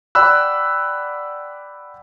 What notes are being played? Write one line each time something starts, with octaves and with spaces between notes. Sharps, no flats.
D5 F#5 G5 B5 E6 F#6